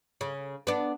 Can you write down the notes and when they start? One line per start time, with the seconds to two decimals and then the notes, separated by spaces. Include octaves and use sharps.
0.21 C#3
0.67 B3 D4